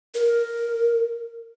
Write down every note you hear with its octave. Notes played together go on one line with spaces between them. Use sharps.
A#4